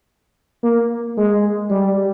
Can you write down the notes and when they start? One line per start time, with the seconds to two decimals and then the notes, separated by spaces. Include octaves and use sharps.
0.63 A#3
1.17 G#3
1.70 G3